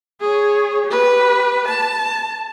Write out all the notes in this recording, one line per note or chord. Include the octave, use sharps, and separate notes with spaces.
G#4 C#5
G4 B4
A5